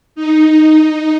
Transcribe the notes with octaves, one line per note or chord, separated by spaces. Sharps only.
D#4